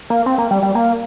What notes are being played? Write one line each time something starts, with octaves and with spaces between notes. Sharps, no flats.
A#3
C4
A#3
G3
G3
A#3